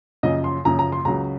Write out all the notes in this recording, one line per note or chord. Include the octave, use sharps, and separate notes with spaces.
F#2 C#3 F3 D#5
C6
F#2 C#3 F3 A#5
A#5
C6
C#2 C#3 F#3 A#5